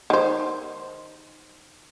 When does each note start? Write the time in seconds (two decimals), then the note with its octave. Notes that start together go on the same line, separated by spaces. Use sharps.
0.10 D#3 C5